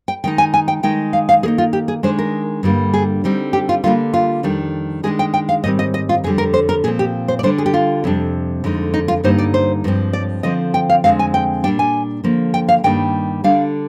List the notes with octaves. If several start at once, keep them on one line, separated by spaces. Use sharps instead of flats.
G5
D#3 G#3 D#4 G5
G#5
G#5
G5
D#3 G#3 D#4 G5
F5
F5
D#3 A#3 D#4 G#4
F4
G4
G#4
D#3 G#3 D4 C5
A#4
G2 D3 G3 A#3
G#4
D3 G3 C4 D#4
G4
F4
D3 G3 A#3 D4 F4
F4
F2 D#3 G3 D4
D#3 G#3 D4 G#4
G5
G5
F5
G#2 D#3 G3 C4 D#5
D#5
D#5
F4
F2 D3 G3 G#4
A#4
C5
A#4
A#2 F3 C4 G#4
G4
C5
D5
D3 G3 D4 C5
G#4
G4
F4
F2 C3 G3 D4
F2 D3 G#3 D#4
D#4
F4
G2 D3 G3 A#3 D#4 C5
D5
C5
G2 F3 G#3 C4
D5
D3 F3 C4 D#5
G5
F5
F2 D3 G#3 C4 F5
G#5
G5
A#2 G3 D4 G5
G#5
D3 F3 A#3
G5
F5
G2 D#3 G3 A#3 D4 G5
D3 G3 D4 F5